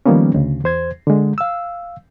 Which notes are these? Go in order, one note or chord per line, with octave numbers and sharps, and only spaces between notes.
D#3 F3 G3 A#3 B3 C#4
D2 C#3
E2 C5 G#6
D3 G#3
F5 E6